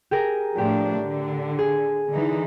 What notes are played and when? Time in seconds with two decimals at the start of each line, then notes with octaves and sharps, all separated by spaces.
0.11 G4 G#4 A#4
0.58 A2 F3 D4 G4
1.03 D3
1.59 G#4
2.11 D3 E3 D#4